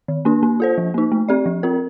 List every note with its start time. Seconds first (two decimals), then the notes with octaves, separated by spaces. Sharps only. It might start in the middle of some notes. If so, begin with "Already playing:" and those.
0.08 D#3
0.25 A#3 D4
0.43 A#3
0.60 F4 A4 C5
0.78 F3
0.94 A#3 D#4
1.12 A3
1.28 C4 G4 D5
1.46 F3
1.63 C4 F4 A#4